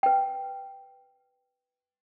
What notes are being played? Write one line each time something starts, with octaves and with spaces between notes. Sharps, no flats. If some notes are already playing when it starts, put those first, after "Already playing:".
B4 G5